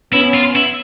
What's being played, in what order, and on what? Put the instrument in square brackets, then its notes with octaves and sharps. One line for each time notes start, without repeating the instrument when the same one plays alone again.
[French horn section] B3 C#4 [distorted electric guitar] E4
[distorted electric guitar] F4
E4